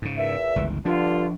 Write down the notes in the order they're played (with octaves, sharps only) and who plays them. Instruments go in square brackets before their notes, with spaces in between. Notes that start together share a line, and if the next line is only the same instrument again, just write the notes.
[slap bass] G#2 C#3
[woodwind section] E2 A#2 E5
[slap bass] G1 C#2 E3
[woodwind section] G2 D3 F4 [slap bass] F3 D4